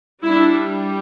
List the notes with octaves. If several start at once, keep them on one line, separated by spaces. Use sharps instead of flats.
G3 D4 E4